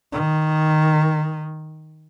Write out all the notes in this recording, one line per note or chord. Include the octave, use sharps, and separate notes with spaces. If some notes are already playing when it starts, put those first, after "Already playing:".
D#3